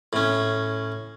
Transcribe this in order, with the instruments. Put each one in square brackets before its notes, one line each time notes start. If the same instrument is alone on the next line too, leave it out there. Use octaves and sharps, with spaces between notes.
[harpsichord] A2 C#4